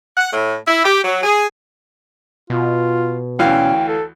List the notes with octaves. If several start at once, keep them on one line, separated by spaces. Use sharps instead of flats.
F#5
A2
E4
G4
F#3
G#4
B2 F4
D2 E3 C#4 F5 G5
A4